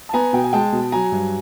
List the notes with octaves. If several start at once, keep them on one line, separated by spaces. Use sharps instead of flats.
A5
B3 G#5 A#5
B2 G5
G#5
G#3 G5 A5
B2
F#3 G#5 A#5
G2